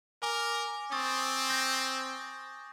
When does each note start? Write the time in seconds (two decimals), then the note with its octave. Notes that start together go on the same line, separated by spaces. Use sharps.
0.23 A#4 G#5 D6 G7
0.92 C4 C#6 D#6 A6
1.50 G6 A#6